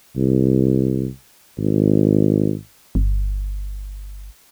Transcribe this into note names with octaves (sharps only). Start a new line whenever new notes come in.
C2
G#1
G1